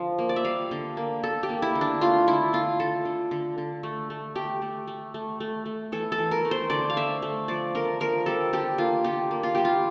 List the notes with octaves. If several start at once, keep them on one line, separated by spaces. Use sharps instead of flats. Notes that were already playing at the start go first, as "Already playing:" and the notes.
Already playing: D3 F3
A#3
D5
E5
G3 F5
D3
A#3
D3 A4
G4
A#3
E4
D3
D4
A3 F4
D3 E4
D3 F4
D3 A4
D3
D3
D3
A3
A3
A3 G4
A3
A3
A3
A3
A3
E3 A4
A4
E3
A#4
A3
C5
D3 D5
F5
A3 E5
A3
F3 D5
D3 A#4
F3 A#4
G3 A4
D3 G4
A#3 F4
D3 G4
A#3
F4
G3 G4
F4